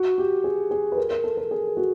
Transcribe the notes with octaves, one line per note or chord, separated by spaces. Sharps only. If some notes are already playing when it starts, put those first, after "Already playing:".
Already playing: F#4
G4
G#4
G#4
B4
A#4
A#4
A4
A#4
G#4
F#4